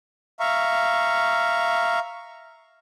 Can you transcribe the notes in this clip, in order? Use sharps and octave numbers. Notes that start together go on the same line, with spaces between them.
E5 F5 A#5 C#6